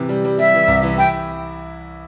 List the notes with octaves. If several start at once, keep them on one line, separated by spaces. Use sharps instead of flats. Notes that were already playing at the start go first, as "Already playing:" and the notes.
Already playing: C3 E3
G3
G3
G3 E5
E3
C2
E3
E4 G5